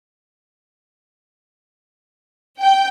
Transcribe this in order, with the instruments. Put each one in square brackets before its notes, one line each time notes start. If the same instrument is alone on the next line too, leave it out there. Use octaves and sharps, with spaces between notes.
[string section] G5